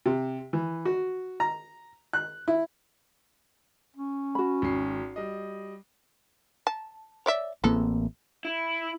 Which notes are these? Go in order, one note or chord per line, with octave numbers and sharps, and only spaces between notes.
C3
E3
F#4
A#5
F#6
E4
C#4
F#4 B5
G#1 C7
G3 D#5
A5
C#5 D5 E5
A1 E3 G#3 A#3 C4 A4
E4